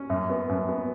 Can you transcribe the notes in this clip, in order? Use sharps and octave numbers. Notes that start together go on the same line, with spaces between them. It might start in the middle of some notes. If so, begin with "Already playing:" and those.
Already playing: C#4
F#2
B3
F#2
B3